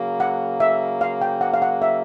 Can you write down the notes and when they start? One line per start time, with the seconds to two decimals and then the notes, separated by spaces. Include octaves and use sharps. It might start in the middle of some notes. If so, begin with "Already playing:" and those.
Already playing: C#3 F#3 A#3
0.20 F#5
0.60 E5
1.01 F5
1.22 G5
1.41 F#5
1.54 F5
1.62 F#5
1.82 E5